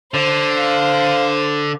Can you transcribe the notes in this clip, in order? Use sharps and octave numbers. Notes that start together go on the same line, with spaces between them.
D3 C5
F5